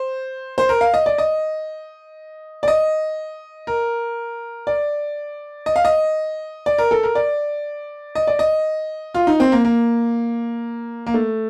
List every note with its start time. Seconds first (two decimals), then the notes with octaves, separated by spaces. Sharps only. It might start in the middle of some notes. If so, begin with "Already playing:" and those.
Already playing: C5
0.58 C5
0.69 A#4
0.81 F5
0.94 D#5
1.06 D5
1.18 D#5
2.63 D5
2.68 D#5
3.67 A#4
4.67 D5
5.66 D#5
5.76 F5
5.85 D#5
6.66 D5
6.78 A#4
6.91 A4
7.03 A#4
7.15 D5
8.15 D#5
8.27 D5
8.39 D#5
9.14 F4
9.27 D#4
9.40 C4
9.52 A#3
9.65 A#3
11.07 A#3
11.14 A3